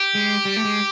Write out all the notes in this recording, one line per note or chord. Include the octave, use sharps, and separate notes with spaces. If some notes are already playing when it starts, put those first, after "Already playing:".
Already playing: G4
G#3
G3
A3
G#3